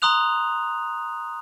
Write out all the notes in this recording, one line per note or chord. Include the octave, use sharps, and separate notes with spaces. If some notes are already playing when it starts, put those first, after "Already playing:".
A#5 C6 D#6 F#6 F7